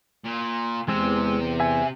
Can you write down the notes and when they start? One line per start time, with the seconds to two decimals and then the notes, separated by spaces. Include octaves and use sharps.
0.25 A#2
0.88 E2 C3 E3 G#3 C4
1.60 E5 G#5